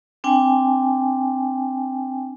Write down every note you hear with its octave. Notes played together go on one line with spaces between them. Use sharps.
C4 D4 G5 G#5